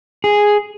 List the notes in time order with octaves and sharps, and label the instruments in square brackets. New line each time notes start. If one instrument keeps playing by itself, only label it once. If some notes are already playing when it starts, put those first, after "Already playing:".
[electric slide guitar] G#4